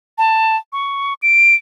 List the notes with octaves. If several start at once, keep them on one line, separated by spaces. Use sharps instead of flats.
A5
C#6
D7